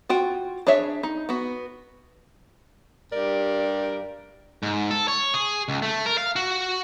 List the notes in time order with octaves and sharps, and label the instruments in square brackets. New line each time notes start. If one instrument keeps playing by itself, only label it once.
[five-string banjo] F4 F#4 G5
D4 G#4 C#5 E5
D#4
B3 F#4
[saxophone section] G2 G4 A#4 D5
[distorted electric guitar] G#2
A4
C#5
G#4
C#2
A3
A#4
F5
F#4